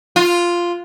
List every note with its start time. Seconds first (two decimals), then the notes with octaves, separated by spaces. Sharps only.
0.16 F4